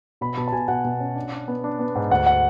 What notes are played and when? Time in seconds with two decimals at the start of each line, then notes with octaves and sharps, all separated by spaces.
0.21 B2 B5
0.37 B2 A5
0.48 A5
0.52 B2 G#5
0.68 B2 F#5
0.85 B2
1.00 C#4
1.16 D4
1.32 D4
1.48 B3
1.64 D4
1.79 B3
1.95 G#2
2.11 D2 F#5
2.26 F#5